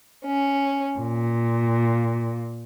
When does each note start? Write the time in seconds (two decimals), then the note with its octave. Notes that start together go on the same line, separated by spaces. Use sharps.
0.24 C#4
1.00 A#2